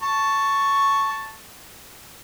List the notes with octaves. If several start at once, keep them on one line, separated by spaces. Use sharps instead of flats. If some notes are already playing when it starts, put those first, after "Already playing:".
A5 C#6